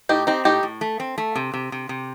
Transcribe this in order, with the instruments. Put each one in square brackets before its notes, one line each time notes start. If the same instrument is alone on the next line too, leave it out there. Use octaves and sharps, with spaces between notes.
[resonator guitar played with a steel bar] A2 [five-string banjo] D#4 G4
[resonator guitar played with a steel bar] C4 [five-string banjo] D#4 G4
[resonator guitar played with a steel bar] A2 [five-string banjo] D#4 G4
[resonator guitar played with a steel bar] A2
A3
C4
A3
C3
C3
C3
C3